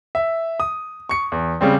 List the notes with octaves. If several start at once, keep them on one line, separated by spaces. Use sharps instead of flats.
E5
D#6
C#6 C#7
E2
C#3 G3 C4